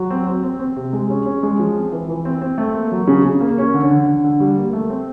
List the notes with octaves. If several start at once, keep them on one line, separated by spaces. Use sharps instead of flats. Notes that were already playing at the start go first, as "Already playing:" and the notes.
Already playing: F#3
C4
C4
C4
C4
C3
G#3
C#4
C#4
G#3
F3
C4
E3
E3
C4
C4
A3
A#3
F#3
C#3
C#3
A#3
C#4
D3
D3
D3
D3
G3
A#3
A3
C4